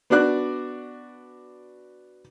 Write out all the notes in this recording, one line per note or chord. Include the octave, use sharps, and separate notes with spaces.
B3 D4 F#4 D5 F#6